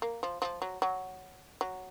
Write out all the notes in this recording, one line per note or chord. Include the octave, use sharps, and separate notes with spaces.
A#3
F3
F3
F#3
F#3
F#3